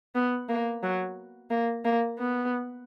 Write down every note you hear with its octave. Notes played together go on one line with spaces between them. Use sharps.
B3
A#3
F#3
A#3
A#3
B3